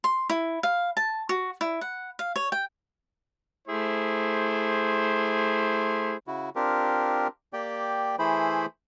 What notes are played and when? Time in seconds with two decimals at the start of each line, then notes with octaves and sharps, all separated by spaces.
0.04 C6
0.30 E4
0.63 F5
0.97 A5
1.29 F#4
1.61 E4
1.81 F#5
2.19 F5
2.36 C#5
2.52 G5
3.67 A3 E4 G#4 C5
6.27 C#3 E4 F#4
6.56 C4 D4 F4 G4 A#4
7.53 A#3 G4 D5 G5
8.19 E3 A3 E4 G#4 C5 B5